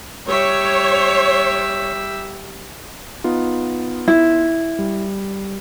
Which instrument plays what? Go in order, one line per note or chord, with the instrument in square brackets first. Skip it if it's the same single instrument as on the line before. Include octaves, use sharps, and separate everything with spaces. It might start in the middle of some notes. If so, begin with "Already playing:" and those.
[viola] G3 E5 [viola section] C#5
[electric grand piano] B3 D#4 F4
[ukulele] E4
[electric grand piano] G3